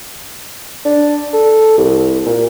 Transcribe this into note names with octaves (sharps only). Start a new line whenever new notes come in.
D4
A4
C2
A#2